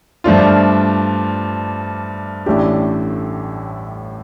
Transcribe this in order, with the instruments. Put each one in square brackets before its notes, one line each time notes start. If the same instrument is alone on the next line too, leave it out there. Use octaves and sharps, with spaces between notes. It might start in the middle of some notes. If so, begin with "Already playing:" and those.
[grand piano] G2 F3 A3 D4 F4
A1 A2 A3 D4 G4